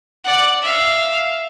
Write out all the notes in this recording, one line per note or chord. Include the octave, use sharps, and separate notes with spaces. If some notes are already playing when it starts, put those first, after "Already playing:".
D5 F#5
E5 F5